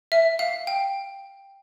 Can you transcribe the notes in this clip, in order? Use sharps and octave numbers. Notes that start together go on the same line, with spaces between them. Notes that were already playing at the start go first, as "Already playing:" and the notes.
E5
F5
G5